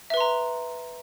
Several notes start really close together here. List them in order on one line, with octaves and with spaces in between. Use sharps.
E5 B4 C6 A#5